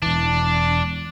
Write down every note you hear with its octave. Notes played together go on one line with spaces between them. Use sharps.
E1 E3 D4